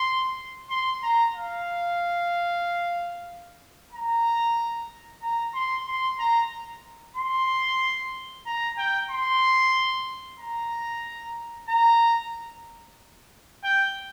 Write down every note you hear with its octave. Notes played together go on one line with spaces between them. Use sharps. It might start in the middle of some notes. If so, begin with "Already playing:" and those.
Already playing: C6
C6
A#5
F5
A#5
A#5
C6
C6
A#5
C6
A#5
G5
C6
A#5
A#5
G5